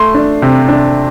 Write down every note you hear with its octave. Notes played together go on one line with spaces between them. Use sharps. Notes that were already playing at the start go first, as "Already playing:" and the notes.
Already playing: A3 C6
D4
C3
D4